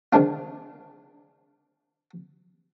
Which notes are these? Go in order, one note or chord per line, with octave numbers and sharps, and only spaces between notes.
D#3 F3 G#3 D4 F4